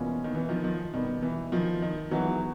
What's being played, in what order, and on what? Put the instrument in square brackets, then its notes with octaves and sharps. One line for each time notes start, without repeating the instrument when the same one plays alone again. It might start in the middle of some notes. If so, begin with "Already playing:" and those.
Already playing: [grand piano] B2 G3 A#3 C#4 F4 [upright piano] E3
[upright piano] D#3
E3
D#3 F3
D#3 F3
[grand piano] B2 G3 B3 [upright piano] D#3
[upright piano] E3
D#3 F3
D#3
[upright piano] E3 F#3 [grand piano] G#3 B3 D#4 F#4